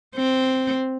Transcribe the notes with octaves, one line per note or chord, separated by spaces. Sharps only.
C4